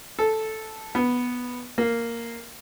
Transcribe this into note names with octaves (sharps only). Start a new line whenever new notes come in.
A4
B3
A#3